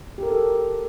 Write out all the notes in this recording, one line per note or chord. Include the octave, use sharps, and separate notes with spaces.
G4 A4 A#4